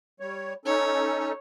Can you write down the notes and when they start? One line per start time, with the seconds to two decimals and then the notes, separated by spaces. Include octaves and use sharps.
0.20 G3 C#5
0.65 C#4 D#4 A4 C#5